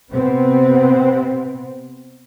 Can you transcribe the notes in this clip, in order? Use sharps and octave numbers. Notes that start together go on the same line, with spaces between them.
C3 B3 C4